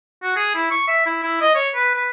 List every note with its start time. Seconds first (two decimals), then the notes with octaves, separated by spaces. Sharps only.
0.23 F#4
0.36 G#4
0.55 E4
0.71 C#6
0.88 E5
1.06 E4
1.23 E4
1.41 D#5
1.55 C#5
1.75 B4
1.96 B4